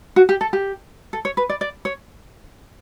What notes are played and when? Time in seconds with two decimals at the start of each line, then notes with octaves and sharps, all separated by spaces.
0.16 F#4
0.29 G4
0.41 A4
0.53 G4
1.13 A4
1.25 C#5
1.37 B4
1.49 D5
1.61 D5
1.85 C#5